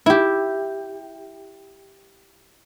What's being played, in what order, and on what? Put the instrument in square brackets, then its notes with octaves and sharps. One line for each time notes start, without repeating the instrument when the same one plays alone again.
[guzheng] E4 G4